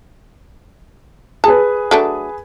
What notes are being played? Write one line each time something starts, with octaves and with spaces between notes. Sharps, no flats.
G#4 B4 A5
F#3 A3 D4